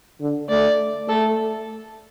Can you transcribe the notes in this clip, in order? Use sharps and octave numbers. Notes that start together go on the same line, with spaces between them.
D3
A3 D5
A3 A4